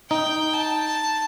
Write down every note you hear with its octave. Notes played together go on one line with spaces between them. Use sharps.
D#4 G5
A5